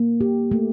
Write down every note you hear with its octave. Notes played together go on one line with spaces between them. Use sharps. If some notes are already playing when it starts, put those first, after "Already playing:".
Already playing: A#3
G4
A3